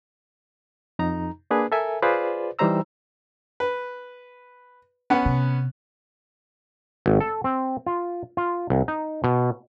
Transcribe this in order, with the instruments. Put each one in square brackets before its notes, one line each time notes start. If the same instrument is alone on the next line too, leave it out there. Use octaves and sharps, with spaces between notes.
[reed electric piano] F2 D#4 A#5
A#3 D4 G#4 B4
A4 A#4 E5 G#5
F4 G#4 B4 C5 D5
E3 G3 D#4 C5 A#5 E6
[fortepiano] B4
B3 C#4 F#5
[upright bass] C3
[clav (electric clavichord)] G#1
A4
C4
F4
F4
C2
D#4
B2